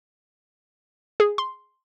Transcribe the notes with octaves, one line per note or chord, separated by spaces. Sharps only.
G#4
C6